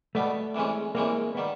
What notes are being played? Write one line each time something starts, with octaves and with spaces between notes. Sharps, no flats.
B2 G3 A3 B3
C2 C3 E3 G#3 C#4
C2 C3 E3 G#3 A#3 C#4
D#3 G3 B3